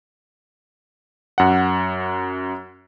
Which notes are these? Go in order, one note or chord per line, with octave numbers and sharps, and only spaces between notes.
F#2 F#5